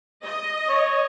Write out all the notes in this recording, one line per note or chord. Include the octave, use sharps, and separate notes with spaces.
D#5
C#5